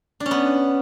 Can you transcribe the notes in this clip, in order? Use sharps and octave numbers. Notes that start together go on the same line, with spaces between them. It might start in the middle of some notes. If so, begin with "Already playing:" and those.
D4
C#4
B3